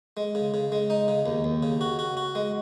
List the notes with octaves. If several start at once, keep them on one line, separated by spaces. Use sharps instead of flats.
G#3
C#3
C#3
G#3
D#4
C#3
D#2
D#2
C#3
F#4
F#4
F#4
G#3